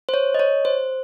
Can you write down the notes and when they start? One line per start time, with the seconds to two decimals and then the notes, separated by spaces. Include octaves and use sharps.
0.09 C5
0.14 C#5
0.34 D#5
0.39 C#5
0.65 C5